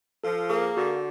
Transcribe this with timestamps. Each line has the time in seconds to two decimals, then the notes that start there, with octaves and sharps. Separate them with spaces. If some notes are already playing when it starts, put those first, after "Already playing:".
0.24 F3 A4
0.50 A#3 G#4
0.76 D3 F#4